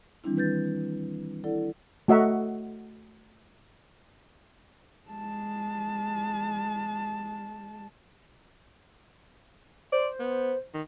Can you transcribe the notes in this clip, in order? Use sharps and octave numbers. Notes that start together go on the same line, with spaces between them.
D#3 E3 G3 C4 D4 E4
B4 G6 A6
E4 A4 D5 F#5
A3 F#4 D#5 E5 F#5 A#5
G#3 A5
C5 D5
B3
D#3